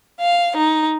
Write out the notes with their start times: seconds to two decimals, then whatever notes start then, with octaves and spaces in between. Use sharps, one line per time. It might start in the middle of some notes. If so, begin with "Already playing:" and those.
0.21 F5
0.58 D#4